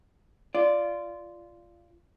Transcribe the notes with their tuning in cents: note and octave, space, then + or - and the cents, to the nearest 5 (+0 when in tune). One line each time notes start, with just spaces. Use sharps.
F4 -15 D5 +0